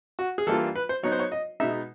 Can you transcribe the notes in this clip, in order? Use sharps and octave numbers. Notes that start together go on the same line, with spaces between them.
F#4
G#4
E3 G3 A#3 D4 F4 A4
B4
C5
F#3 B3 D#4 C#5
C5
C#5
D#5
B2 G#3 B3 D#4 E5